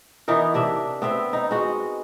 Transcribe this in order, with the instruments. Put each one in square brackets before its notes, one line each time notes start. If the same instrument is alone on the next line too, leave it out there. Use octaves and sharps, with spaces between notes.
[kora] E3 B3 D#4 A#4
C3 D4 E5
B3 C4 E5
D#4
G#3 F#4